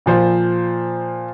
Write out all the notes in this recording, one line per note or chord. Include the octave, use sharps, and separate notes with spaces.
A#2 F3 C5